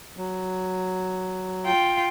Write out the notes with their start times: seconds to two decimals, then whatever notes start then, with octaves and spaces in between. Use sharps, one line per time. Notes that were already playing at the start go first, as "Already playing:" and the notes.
0.17 F#3
1.66 F4 G5